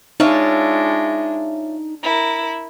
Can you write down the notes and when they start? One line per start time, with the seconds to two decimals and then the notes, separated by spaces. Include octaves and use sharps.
0.20 G#3 D4 D#4 F4 C#5 E5
2.03 E4 A#4